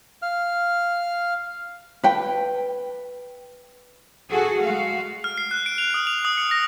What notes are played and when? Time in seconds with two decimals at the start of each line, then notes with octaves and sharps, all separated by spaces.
0.22 F5 F6
2.04 B4 G5
4.30 F#4 G#4 A4
4.61 G#3 A3 F#4 F5
5.24 F6
5.38 C7
5.51 F#6
5.66 D7
5.78 F7
5.94 D#6
6.07 F7
6.25 D#6
6.38 C#7
6.51 A#6